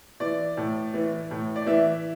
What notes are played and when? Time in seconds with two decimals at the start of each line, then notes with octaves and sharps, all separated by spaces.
0.20 E3 D5
0.57 A2
0.94 E3
1.31 A2
1.56 D5
1.66 E3 E5